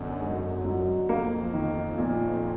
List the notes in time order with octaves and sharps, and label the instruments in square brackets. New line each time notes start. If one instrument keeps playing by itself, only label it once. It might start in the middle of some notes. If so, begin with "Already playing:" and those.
Already playing: [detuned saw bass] F#2 [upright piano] B2 D3
[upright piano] G#2
F#3
[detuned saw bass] F2 [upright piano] A#3
[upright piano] D#3
A#2